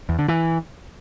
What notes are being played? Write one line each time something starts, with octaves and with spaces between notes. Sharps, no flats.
E2
D3
E3